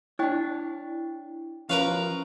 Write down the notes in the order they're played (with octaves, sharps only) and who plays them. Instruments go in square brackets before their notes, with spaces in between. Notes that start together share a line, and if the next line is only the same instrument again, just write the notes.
[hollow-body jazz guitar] D4 C#5 [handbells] E4 G5
[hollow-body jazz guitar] F3 C#4 [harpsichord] A#4 B4 F5